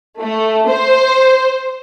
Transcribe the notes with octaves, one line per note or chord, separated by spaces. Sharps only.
A3
C5